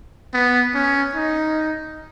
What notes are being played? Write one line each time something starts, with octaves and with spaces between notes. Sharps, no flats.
B3
C#4
D#4